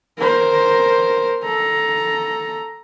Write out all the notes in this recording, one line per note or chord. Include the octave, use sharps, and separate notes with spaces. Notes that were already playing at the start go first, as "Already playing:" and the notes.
A#4 C5
A4 A#5